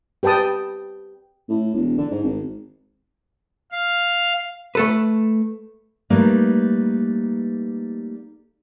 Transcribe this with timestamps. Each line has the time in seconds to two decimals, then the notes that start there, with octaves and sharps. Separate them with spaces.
0.23 G4 B4 G5 A5 D#6
1.49 A2
1.74 E1
1.97 D3
2.11 G#2
2.23 G#1
3.72 F5
4.75 A3 A4 B4
6.10 G3 A3 A#3 D#4 B4